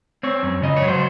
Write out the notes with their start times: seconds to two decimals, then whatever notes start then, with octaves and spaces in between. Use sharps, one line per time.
0.23 C4 C#5
0.43 F#2
0.62 C#3 D#5
0.77 C#5
0.82 F#3
0.88 C5